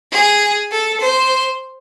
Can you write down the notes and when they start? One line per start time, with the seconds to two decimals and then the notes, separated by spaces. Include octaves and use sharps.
0.13 G#4
0.71 A4
1.00 C5